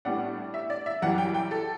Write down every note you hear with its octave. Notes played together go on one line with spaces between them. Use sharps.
A2 G3 B3 D4 F#5
E5
D5
E5
F#2 E3 G3 F#5
G5
G5
A4